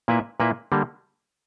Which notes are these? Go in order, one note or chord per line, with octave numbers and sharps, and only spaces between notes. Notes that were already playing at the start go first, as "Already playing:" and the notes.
A#2 A#3 E4 B4 E5
A#2 A#3 E4 B4 E5
D3 G3 A#3